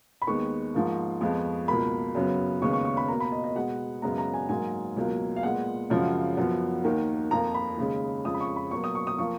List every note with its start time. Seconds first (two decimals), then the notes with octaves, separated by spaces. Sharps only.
0.22 B5
0.27 D#2 D#3 G#3 B3 C#6
0.74 G#2 F3 A#3
1.21 F2 F3 G#3 B3
1.68 C#2 B2 A#3 B5
2.15 F#2 C#3 F#3 B3
2.62 D#2 C#3 G#3 B3 C#6
2.73 C#6
2.85 C#6
2.97 B5
3.08 B2 A#3 A#5
3.20 B5
3.32 D#5
3.44 D#5
3.55 B2 G#3 B3 F#5
4.02 F#2 C#3 G#3 B3 A#5
4.18 A#5
4.34 G#5
4.49 G#2 F#3 A#3 G#5
4.96 C#2 B2 F#3 A#3
5.36 F5
5.43 A#2 G#3 B3 F#5
5.90 F#2 C#3 F3 G#3
6.37 F#2 F3 B3
6.84 D#2 D#3 A#3
7.31 F2 F3 A#3 A#5
7.54 B5
7.78 D#2 C#3 G#3
8.25 F2 C#3 G#3 D#6
8.34 B5
8.40 C#6
8.56 B5
8.71 B2 F#3 A#3 C#6
8.84 D#6
8.95 C#6
9.07 D#6
9.18 F3 A#3 C#6